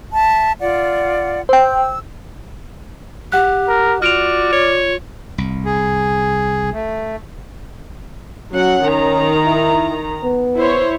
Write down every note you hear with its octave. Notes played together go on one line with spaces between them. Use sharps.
E5 A5
F4 D5 F#5
C5 G5 E6
G4 F#5 F#6
A#4
F4 F#4 D5 F6 D7 F7
C#5
C2
G#4
A3
F#3 C#4 F#5
D#3 A#5
E4
B3
E4 C5 C#5